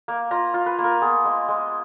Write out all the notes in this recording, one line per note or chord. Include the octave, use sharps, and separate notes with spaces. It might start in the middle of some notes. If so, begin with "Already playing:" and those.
A#3
F4 A#5
F4
B4
A#3
A#4
B3 G#4
G#3
G#3